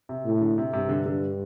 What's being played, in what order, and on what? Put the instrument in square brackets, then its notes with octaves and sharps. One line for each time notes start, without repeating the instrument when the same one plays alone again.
[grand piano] C3
[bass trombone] A2
[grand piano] D3
C3
[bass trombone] G2 [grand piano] C3
[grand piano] D3
D3